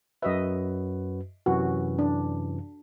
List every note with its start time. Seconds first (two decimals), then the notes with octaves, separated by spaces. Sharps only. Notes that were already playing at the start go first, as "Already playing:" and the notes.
0.22 F#2 F#4 B4 D#5 E5
1.46 F#2 C3 E3 F#4
1.99 D4